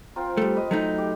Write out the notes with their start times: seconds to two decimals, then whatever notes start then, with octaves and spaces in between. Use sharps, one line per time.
0.16 C4 F4 A#4
0.37 G3 A3
0.55 B4 D#5
0.71 F#3 A3 D#4
0.98 G4